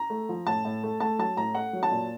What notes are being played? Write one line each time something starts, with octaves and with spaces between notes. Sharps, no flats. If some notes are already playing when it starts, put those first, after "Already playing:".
Already playing: A#5
A3
F3
A2 A5
A2
A3
A3 A5
F#3 A5
A2 A#5
A3 F#5
F#3
A5
A#2